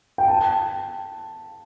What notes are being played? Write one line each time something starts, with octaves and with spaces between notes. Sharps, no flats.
G5
A5